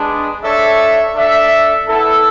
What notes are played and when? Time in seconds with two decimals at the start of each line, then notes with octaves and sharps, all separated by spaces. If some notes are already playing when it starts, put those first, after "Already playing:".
Already playing: G#3 B3 D4
0.44 D4 A4 C#5 E5
1.16 D4 A4 E5
1.88 B3 E4 A4